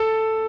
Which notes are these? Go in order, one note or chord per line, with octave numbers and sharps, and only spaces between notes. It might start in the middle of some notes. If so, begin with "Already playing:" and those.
Already playing: A4